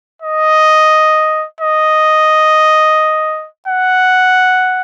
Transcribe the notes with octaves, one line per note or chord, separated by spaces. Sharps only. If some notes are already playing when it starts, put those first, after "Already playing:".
D#5
D#5
F#5